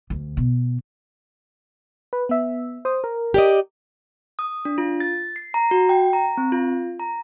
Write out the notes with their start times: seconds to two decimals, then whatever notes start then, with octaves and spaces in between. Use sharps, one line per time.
0.10 D2
0.37 B2
2.13 B4
2.29 B3 E5
2.85 C5 D#6
3.04 A#4
3.34 G4 D5 D#5
4.39 D#6
4.65 D4
4.78 F4
5.00 A6
5.36 C7
5.54 A#5
5.71 F#4
5.89 G5
6.13 A#5
6.37 C4
6.52 F4
7.00 A#5